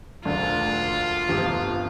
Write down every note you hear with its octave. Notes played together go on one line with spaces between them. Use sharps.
E1 D2 D3 F4
G1 F2 C3 F3